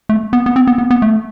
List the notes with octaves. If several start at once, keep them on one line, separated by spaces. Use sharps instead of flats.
A3
B3
B3
C4
B3
B3
B3
A3